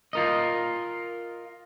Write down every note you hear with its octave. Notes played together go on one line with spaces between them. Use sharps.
F4 A#4 D#5